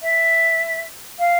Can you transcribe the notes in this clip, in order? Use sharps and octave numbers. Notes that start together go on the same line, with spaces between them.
E5
F5